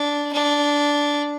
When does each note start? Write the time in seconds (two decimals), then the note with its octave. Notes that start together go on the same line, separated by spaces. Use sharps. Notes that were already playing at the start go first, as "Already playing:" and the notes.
Already playing: D4
0.33 D4